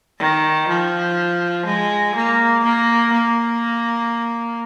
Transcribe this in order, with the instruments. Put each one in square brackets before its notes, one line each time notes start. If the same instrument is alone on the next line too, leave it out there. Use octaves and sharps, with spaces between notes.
[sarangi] D#3
F3
G#3
A#3
A#3
A#3